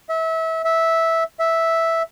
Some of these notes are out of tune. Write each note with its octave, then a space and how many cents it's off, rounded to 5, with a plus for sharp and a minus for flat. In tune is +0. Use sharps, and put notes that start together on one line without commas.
E5 -30
E5 -10
E5 -5